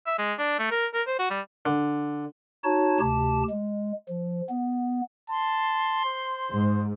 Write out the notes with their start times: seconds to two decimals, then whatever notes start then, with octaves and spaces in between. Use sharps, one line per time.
0.06 E5
0.18 G#3
0.39 D4
0.59 A3
0.71 A#4
0.94 A#4
1.07 C5
1.19 F#4
1.30 G3
1.66 D3
2.64 D#4 F#4 C#5 A5
3.00 D2 C3 G4 A5
3.50 G#3
4.09 F3
4.49 B3
5.30 A5 C6
6.05 C5
6.51 G#2